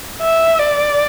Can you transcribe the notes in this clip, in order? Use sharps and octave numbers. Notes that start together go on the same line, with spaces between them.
E5
D5